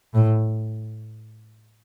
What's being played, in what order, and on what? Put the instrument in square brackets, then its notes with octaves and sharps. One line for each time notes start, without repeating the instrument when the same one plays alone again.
[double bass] A2